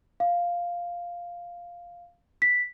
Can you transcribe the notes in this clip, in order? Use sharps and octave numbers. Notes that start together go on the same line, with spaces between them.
F5
B6